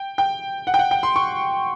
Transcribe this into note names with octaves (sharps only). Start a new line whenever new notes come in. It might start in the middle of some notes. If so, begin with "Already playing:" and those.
Already playing: G5
G5
F#5
G5
F#5
G5
C6
C#6